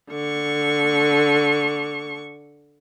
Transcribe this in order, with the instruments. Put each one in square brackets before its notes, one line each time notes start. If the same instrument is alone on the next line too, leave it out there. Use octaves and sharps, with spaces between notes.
[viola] D3 C#6